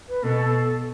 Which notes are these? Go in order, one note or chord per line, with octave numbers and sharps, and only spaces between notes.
B4
B2 A4